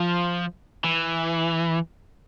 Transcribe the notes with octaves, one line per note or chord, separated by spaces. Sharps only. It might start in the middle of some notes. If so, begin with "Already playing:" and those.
Already playing: F3
E3